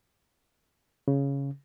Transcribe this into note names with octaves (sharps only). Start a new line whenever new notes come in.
C#3